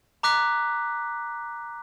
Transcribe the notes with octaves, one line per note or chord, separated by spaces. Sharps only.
A#5 D6 F#6 B6